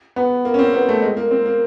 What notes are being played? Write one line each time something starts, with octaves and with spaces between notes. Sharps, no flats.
B3
A#3
C#4
C4
B3
A3
G#3
A#3
C4
A#3